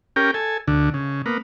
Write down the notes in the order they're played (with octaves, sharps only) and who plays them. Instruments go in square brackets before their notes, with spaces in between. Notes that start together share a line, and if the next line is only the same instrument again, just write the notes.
[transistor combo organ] C#4 G4 A#4 G5
A4 G#5
D2 D3
C#3
A#3 B3